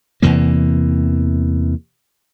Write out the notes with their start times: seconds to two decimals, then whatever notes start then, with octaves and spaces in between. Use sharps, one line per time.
0.22 E2 C3 E3 A#3